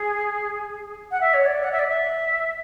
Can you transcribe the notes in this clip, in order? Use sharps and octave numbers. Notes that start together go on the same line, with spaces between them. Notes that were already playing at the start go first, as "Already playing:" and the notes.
Already playing: G#4
F#5
E5
C#5
D5
F#5
E5
D5
E5